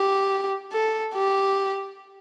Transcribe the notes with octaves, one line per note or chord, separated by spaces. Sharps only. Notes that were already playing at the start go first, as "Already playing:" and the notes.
Already playing: G4
A4
G4